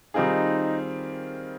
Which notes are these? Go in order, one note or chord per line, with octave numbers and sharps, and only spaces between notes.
D#3 G3 C4 D#4 F4 G#4